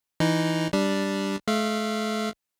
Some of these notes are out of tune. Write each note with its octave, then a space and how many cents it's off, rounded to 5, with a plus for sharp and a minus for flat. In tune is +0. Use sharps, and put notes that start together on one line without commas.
E3 +0 D#4 +0
G3 +0 D4 +0
A3 -40 F5 -35